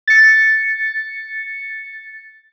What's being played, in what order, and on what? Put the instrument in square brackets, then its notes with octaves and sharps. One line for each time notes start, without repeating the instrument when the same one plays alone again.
[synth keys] A6 C#7